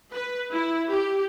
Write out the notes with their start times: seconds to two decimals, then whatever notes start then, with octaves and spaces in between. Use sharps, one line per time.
0.13 B4
0.52 E4
0.91 G4